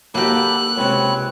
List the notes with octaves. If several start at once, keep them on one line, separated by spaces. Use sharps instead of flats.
D#2 A#3 F#4 G4 A4 B5 D6 F#6
C#2 C3 C4 B4 C#5